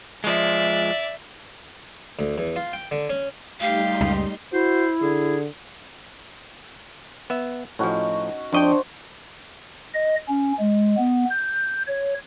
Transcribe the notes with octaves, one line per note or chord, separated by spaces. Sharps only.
F3 G#3 D5 E5
D2
E2
F4
G5
D3
C#4
G3 A3 D#4 G4 F5 C6
C#2 F#2
E4 F#4 C5
D3 G#4
B3 E5
A2 F3 C#4 D#4 F#4
F2 D4 C5 D#5 G5 C#6
D#5
C#4
G#3
B3
G6
C#5